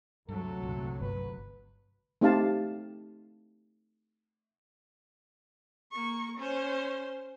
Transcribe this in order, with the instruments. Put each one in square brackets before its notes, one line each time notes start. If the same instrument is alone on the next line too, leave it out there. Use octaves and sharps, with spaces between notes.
[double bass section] D2 C3 F#3 [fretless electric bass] G2 G3 [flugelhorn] A4
[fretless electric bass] C2 G2 A#2
[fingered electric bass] G1 [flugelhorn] B4
[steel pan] A3 C4 D#4 G4 F5 A5
[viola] A#3 C#6
C#4 C5